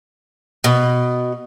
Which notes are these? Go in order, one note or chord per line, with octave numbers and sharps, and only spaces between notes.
B2